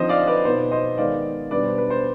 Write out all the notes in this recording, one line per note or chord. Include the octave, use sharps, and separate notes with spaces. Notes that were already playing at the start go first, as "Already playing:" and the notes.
Already playing: D3 F3 C4 D#4 C5 D#5
D5 F5
B4 D5
B2 B3 D#4 C5
C5 D#5
D#3 G#3 B3 D#4 D5 F5
B2 G3 D4 B4 D5
C5
B4
C5